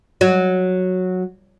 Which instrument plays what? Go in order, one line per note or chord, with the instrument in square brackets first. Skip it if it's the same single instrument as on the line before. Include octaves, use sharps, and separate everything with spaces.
[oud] F#3